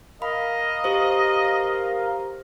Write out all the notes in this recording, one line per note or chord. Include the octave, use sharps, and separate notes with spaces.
A#4 D#5 F5 B5
G4 C5